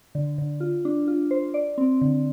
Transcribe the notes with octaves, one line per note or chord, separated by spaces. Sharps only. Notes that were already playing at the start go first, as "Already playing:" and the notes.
D3
D3
F4
D4
F4
C5
D5
C4
D3